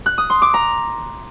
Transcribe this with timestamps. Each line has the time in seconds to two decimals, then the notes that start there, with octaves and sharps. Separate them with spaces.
0.06 F#6
0.18 D#6
0.30 C6
0.42 D6
0.54 A#5